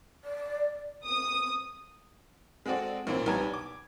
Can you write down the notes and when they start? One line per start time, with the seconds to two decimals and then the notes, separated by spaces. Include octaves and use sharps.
0.24 D5
1.05 D#6
2.66 G#3 C4 F#4 A4 D5 F#5
3.07 B1 A#2 A#3 C4
3.26 B1 G3 B3 A5 A#5 G#6
3.54 D6